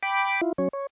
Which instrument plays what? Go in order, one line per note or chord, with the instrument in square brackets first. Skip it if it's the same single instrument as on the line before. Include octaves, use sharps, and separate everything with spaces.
[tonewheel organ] G5 B5 D6
E4 F4
F#3 C#4 C#5
C#5